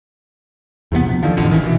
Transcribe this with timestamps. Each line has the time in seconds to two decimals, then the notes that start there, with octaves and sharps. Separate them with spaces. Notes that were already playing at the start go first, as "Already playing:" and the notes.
0.92 E2 C3 A3 B3
1.05 A#1
1.23 D3 D#3 F3
1.37 A1 F2 D3
1.50 G#1 D#3 E3 C#4
1.63 B2 E3